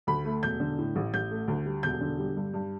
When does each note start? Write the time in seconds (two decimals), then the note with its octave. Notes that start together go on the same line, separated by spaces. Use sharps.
0.07 D2 B5
0.25 A3
0.43 E1 G6
0.60 D3
0.79 A2
0.96 A1
1.14 A1 G6
1.31 A3
1.48 D2
1.65 G3
1.83 E1 G6
2.01 D3
2.19 G3
2.37 G2
2.54 G2